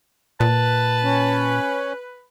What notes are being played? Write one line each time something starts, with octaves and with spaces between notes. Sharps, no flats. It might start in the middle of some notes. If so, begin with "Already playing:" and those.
A#2 B4 A5
C#4